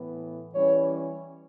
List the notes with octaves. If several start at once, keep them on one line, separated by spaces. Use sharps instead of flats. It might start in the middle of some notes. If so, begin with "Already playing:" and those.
Already playing: A2 E3 B3
E3 G3 C#4 C#5